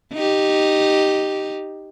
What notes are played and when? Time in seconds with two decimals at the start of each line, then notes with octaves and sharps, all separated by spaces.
0.13 D#4 G4